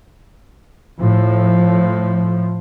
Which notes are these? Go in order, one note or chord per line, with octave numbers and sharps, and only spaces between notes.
A2 F3